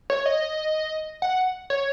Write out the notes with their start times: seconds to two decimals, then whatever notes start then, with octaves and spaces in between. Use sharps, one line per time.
0.10 C#5
0.26 D#5
1.22 F#5
1.70 C#5